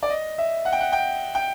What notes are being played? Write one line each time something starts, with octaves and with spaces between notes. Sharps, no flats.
D5
D#5
E5
F#5
G5
F#5
G5
G5